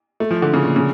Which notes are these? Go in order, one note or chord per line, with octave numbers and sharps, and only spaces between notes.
A3
F3
D3
C#3
A#2
C#3